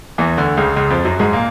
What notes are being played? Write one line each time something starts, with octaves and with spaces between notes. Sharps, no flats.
E2 E3
D2 D3
C#2 C#3
C#2 C#3
F2 F3
F#2 F#3
G#2 G#3
A#2 A#3